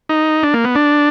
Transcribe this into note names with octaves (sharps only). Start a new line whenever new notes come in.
D#4
D4
A#3
B3
D4